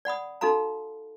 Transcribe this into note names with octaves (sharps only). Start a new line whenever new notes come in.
D5 F#5 B5 D#6
D#4 F#4 A4 F5 A#5